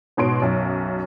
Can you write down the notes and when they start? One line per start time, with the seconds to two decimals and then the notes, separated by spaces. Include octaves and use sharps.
0.17 G#2 B2 C#5 C6 D7
0.42 B1 F#2